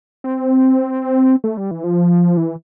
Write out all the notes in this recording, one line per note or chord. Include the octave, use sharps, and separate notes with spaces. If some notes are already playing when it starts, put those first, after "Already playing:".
C4
A3
G3
E3
F3
E3